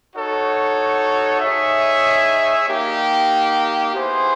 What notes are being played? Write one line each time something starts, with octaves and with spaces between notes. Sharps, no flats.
D#4 F#4 A4 C#5
D#4 G#4 C#5 E5
A#3 D#4 G4
B3 E4 G#4 C5